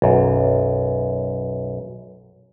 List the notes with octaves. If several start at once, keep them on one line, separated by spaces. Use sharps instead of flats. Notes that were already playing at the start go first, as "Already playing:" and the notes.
B1 F#2